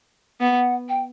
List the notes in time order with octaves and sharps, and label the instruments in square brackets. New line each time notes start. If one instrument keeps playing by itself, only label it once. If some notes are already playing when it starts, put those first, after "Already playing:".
[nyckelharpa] B3 [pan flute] F#5
[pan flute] G5